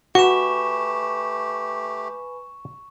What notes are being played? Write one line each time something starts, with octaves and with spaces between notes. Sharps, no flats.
A3 F#4 G4 B4 G#5 B5 C#6 E7